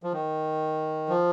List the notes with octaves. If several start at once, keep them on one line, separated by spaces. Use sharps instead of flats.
F3
D#3
F3